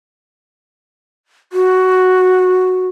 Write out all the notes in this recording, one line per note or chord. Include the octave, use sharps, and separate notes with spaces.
F#4